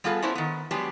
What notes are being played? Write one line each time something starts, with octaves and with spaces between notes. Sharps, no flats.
G3 B3 F4 G#4 A4
B3 C#4 D4 E4 C5
D#3 B3
F#3 G#3 B3 D4 G4